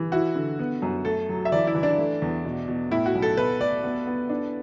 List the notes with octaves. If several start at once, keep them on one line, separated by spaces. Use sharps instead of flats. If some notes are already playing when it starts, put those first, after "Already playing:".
Already playing: E3
E4 F#4
D3
B3
F#2
A3 A4
F#3
E5
E3 D5
E4
E3
D4
A3
E2
B2
B2
A2 E4
F#4
B1
A4
B2 B4
A3 D5
B3
B3
D4